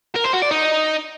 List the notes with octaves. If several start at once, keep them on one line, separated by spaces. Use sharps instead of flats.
A#4
C5
F#4
D5
D#4